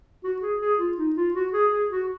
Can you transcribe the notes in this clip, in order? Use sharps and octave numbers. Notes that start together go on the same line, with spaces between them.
F#4
G#4
G#4
F4
D#4
F4
F#4
G#4
G#4
F#4